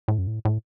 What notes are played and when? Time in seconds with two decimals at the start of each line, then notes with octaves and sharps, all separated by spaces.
0.08 A2
0.18 F#2
0.27 A2
0.45 A2